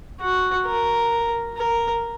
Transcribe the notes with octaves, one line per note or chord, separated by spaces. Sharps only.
F#4
A#4
A#4